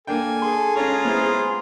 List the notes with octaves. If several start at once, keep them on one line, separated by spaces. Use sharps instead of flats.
A#3 D4 A4 G5 G#5
G#4 A4 C6
G#3 C#4 F4 C#5 A#5
B3 E4 C5